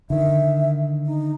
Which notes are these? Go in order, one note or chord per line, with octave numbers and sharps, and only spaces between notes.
D3 D#3 E5
D#4